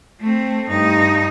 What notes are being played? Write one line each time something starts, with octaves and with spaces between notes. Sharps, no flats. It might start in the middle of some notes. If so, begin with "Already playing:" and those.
A3 C4
G2 D#4